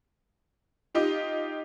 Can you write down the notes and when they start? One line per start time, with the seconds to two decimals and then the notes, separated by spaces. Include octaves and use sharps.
0.95 D#4 F4 G4 D#5